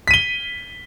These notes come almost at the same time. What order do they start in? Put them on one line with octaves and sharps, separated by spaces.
B6 D#7 G7